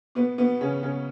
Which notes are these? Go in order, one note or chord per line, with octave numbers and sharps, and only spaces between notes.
B2 B3
B2 B3
C#3 C#4
C#3 C#4